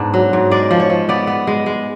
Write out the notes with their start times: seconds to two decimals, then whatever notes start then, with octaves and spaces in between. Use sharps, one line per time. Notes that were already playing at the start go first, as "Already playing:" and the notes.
Already playing: G#2 B3 D4
0.14 F#3
0.33 G#2
0.51 G#3 D5
0.71 F3
0.80 C#5
0.90 F3
1.09 B3 D5
1.27 B3
1.47 G#3
1.66 G#3